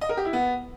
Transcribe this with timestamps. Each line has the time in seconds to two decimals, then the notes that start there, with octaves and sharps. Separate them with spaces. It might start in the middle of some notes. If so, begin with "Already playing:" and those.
0.01 D#5
0.09 A#4
0.17 G4
0.25 E4
0.33 B3